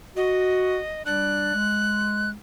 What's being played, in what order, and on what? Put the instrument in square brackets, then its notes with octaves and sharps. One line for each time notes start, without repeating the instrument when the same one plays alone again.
[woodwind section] F#4 [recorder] D#5
[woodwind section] G3 D4 D5 [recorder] F#6
[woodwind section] G#3